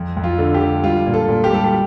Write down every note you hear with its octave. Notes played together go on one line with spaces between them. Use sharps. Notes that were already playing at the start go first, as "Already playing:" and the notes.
Already playing: F2
F2
F4
D3
G4
D3
G3 F4
A#2
A4
A#2
G4
G3 A4
G4